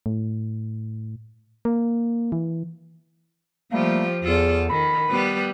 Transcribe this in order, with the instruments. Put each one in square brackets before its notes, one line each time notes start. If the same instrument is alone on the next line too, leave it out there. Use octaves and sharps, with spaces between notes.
[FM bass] A2
A#3
E3
[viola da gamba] F3 F4 G4 [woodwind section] G3 A3 A#3
[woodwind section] E2 [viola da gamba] F4 A4
[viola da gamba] D#3 [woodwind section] B5
[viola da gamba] G3 B3 B4